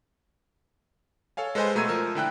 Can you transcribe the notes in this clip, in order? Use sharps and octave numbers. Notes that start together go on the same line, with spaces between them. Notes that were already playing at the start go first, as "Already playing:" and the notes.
A4 C#5 F5 G#5
G#3 A4 B4 C5 D#5 G#5
B2 A3 A#5 E6 G#6 D#7
F3 A#4 E6
D3 E4 G5 F#6